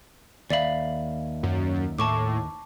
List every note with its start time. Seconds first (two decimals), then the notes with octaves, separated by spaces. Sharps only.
0.50 D#2 D5 E5 F5 B5
1.43 F#2
1.99 A2 A5 C#6 D6